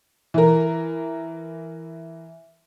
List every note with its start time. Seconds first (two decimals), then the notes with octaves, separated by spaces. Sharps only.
0.34 E3 A#4